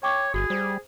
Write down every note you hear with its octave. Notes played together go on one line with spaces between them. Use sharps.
C#5 G5 C#6 D6
G1 F#4 G#4
G3 C5